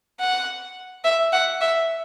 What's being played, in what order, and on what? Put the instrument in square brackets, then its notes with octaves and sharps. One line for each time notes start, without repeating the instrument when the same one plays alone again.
[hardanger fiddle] F#5
E5
F#5
E5